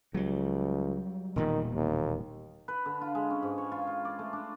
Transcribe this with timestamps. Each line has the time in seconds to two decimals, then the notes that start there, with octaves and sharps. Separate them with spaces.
0.14 C#2 F#3 G3
1.36 E1 A#2 D#3 G3
1.75 D#2
2.68 B4
2.86 D3
3.01 F4
3.15 G#3
3.30 C#4
3.43 G#2
3.58 C#5
3.72 F4
3.87 F4
4.05 D5
4.19 A3
4.33 D4